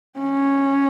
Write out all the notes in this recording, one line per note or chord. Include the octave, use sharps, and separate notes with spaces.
C#4